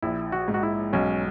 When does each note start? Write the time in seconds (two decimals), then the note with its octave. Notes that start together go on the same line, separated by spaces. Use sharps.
0.03 A#1 E4
0.32 F#4
0.48 G#2
0.54 F#4
0.63 E4
0.93 B1 C#4